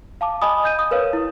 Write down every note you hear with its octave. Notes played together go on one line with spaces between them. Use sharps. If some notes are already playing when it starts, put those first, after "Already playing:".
F5 A5 D6
D#5 G#5 B5 D#6
D#5 G6 D#7
D#6
A#4 B4 C#5 F5
E4